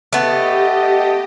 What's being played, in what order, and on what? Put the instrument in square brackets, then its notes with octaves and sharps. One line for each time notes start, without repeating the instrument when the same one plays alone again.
[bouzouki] A3 B3 [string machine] G4 D#5